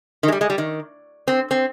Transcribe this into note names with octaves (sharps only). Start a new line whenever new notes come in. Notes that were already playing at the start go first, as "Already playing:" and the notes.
D#3
G#3
G3
G#3
G3
D#3
C4
C4